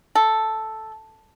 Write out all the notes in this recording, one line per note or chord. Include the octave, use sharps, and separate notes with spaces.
A4